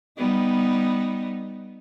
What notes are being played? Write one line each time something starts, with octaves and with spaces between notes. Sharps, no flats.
G3 B3 D#4